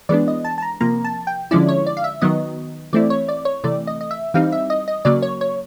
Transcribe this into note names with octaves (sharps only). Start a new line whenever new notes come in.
E3 G#3 B3 D4 D5
D#5
A5
A5
A#5
C3 F3 A#3 A#5
A5
G5
D3 F3 G#3 C#4 E4 D5
C#5
D5
F5
E5
D#3 F#3 B3 D#5
E3 A3 C4 E4 D5
C#5
D5
C#5
C3 E3 A3 D5
D#5
D#5
E5
E3 G3 C4 D#4 F5
E5
D#5
D#5
C#3 F#3 A#3 D5
C#5
C#5